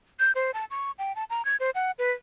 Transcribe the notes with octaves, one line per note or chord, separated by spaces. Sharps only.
G6
C5
A5
C#6
G5
A5
A#5
G#6
C5
F#5
B4